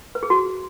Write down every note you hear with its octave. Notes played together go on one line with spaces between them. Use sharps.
B4
G#4
F#4